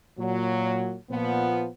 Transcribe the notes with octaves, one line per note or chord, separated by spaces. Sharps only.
A#2 F#3
A#2 F3 B3